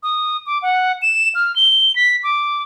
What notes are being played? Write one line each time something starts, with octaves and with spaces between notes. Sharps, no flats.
D#6
D6
F#5
E7
F6
G7
B6
D6